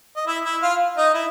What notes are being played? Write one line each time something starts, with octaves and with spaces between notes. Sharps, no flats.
D#5
E4 E5
E4 E5
F4 F5
D#4 D#5
E4 E5